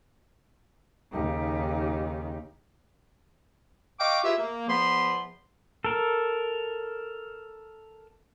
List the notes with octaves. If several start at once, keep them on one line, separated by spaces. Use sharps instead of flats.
D#2 C#3 D#4 G4
D#5 F5 G5 C#6 D6
E4 F4 G4 G#4 B4 E5
A#3
E2 F3 B3 B5 C6
A4 A#4